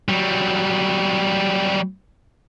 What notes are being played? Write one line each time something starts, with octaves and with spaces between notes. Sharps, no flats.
F#3 G3